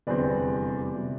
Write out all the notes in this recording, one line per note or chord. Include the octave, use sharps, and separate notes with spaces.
F1 E2 D3 G3 C4 B4 D5
C3 G3 B3